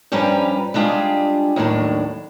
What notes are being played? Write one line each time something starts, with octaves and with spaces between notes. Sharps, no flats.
G2 F3 G3 C#4 B4 A#5
G3 G#3 D4 F4 G4 G#4
D#2 A2 F#3 D4